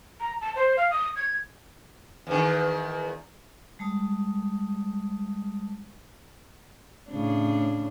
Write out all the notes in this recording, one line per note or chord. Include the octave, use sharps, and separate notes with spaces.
A#5
A5
C5
F5
D#6
G#6
E2 D#3
G3 G#3 A5 D#6
A2 C#3 D4